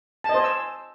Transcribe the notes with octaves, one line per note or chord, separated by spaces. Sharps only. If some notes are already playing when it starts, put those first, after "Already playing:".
C5 D#5 G#5 A5 E6